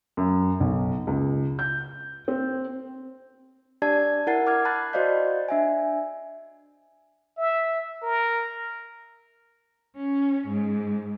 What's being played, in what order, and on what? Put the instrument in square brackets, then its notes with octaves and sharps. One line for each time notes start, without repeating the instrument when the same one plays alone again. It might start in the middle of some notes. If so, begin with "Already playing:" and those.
[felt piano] F#2
B1
C#2
G6
C4
[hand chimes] D4 G4 D5 A5 G#6
E4 A#4 F#5 A6 C7
D6 F6 G#6
A5 B5 F#6 A6
F#4 C5 D5 D#5 F5 G6
D4 E5 G#5
[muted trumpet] E5
A#4
[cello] C#4
G#2